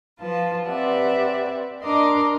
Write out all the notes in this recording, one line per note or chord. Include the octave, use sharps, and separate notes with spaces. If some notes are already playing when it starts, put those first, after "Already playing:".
F3 F4 B4 A5
C4 G4 B4 D5 E5 F#5
D4 A#4 D#5 A#5 C6 D6